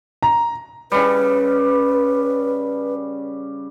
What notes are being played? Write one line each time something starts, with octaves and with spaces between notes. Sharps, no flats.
A#5
C#3 G3 B4